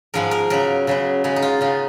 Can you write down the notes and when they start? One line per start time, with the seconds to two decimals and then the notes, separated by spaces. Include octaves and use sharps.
0.14 G#2 F3 G#3 B3 A#4
0.31 A#4
0.50 C#3 F#3 B3 A#4
0.87 C#3 F#3 B3
1.24 C#3 G#3 B3
1.36 D#4
1.42 F4
1.61 C#3 G#3 B3 F4